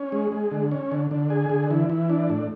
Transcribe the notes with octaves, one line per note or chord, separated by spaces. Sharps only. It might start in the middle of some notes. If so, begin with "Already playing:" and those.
Already playing: C#4
G#3
G#3
D3
C#4
D3
D3
G#4
D3
E3
E3
D4
A2